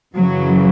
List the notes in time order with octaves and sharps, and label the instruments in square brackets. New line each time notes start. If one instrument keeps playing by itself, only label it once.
[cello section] F#2 C#3 E3 F#3